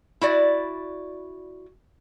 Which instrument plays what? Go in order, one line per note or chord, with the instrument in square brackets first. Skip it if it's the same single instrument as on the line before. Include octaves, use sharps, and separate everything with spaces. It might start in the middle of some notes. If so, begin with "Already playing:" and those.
[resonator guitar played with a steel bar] E4 F#4 D5